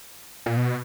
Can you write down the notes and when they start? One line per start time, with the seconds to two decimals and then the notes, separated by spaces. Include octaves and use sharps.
0.46 A#2
0.57 B2